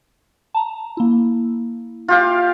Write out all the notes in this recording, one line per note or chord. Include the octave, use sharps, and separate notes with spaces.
A5 A#5
A#3 E4
F4 G4 F5